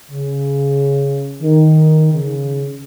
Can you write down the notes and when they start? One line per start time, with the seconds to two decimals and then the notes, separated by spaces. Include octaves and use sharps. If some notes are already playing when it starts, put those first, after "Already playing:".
0.10 C#3
1.41 D#3
2.13 C#3